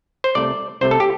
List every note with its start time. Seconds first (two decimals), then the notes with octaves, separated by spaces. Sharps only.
0.24 C5
0.35 C2 C3 A3 D5
0.81 C2 C3 A3 C5
0.91 A4
1.00 G4